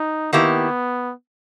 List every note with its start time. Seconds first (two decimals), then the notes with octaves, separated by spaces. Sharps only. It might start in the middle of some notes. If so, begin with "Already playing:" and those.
Already playing: D#4
0.33 D#3 A#3 B3 E4 G4